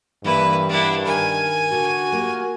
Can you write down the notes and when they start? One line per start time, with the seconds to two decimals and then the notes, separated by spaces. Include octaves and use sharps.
0.24 G2 E3 G3 A#3 E4 B4
0.69 B3 D4 E4 A#4
1.05 D#3 A#4 G#5
1.72 D3 C#4 F#4 A4
2.12 A#3 F4 G4